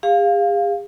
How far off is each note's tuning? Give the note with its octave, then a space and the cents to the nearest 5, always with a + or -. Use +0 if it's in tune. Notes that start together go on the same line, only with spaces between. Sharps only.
G#4 -45 F5 +0